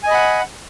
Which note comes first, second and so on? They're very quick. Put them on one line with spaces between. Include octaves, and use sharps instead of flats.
G#5 D#5 B5 F#5